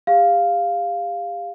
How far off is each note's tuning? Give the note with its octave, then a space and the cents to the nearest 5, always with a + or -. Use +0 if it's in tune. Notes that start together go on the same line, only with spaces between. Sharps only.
G4 +40 F5 +0